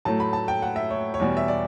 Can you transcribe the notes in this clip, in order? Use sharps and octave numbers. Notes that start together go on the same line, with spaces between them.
A2 F#3 A3 A5
B5
A5
G5
F#5
E5
C#5
C#5
E2 B2 G3
E5
D5